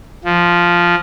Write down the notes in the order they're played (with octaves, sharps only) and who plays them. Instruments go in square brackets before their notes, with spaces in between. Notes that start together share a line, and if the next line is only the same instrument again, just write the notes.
[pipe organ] F3